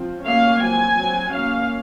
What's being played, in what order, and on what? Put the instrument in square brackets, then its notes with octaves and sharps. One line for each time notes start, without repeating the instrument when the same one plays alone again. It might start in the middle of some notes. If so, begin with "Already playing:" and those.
Already playing: [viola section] F3 C4
F#3 A#3 C#4 F5
F#3 C4 G#5
F#3 C4
F#3 A#3 C#4 F5